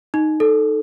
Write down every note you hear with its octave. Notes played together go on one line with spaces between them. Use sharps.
D#4
A4